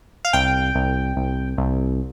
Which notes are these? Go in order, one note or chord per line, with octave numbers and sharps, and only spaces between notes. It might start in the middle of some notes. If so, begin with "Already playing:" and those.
F5
C2 G5
C2
C2
C2